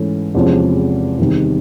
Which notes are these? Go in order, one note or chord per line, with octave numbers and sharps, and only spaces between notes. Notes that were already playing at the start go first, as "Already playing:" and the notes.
Already playing: G#2 E3 A3 C#4
E2 C3 F3 G#3 C#4
E2 C3 D#3 G3